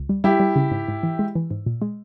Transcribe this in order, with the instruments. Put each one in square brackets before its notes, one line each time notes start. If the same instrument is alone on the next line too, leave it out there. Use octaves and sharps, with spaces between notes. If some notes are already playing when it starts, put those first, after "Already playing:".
Already playing: [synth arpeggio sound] C#2
G3
[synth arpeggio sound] G3 [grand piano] E4 G4
[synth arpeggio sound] G3
C#3
G#2
G#2
E3
G#3
E3
G#2
A#2
G#3